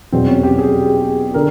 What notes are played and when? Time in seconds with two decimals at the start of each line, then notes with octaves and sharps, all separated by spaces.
0.12 E2 B2 F#3 C4
0.28 C#4
0.43 G4
0.58 G#4
1.34 D3 A#4